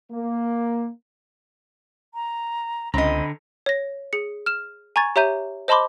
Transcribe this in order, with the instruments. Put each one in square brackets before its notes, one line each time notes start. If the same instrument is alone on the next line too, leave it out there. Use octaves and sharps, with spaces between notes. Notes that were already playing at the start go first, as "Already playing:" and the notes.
[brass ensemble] A#3
[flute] A#5
[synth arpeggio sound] C#2 [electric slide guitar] D3 A#5 [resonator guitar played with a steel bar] C4 D#5 [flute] B5
[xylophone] C#5 A#6
G#4 C#7
F6 E7
G#5 A#5 C#6 G#6 A6
G4 C#5 E5 A#5 G6 D#7
C5 D#5 A5 B5 C6 D6